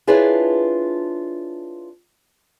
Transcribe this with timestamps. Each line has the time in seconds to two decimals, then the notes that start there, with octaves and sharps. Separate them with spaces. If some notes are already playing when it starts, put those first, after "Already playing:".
0.07 D4 E4 F4 G#4 B4 C#5